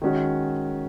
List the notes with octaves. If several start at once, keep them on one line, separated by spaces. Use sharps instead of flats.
D#3 G#3 C#4 F#4